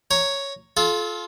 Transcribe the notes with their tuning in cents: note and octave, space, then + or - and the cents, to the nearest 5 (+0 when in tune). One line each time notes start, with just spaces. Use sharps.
C#5 +0 A#5 +0
F4 +0 A4 -35